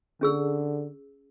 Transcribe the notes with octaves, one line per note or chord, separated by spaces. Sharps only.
D3 C#4 G#4 E6